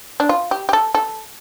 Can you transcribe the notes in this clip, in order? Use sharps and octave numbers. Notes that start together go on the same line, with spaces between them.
D4
F4
G4
G4
A4
A4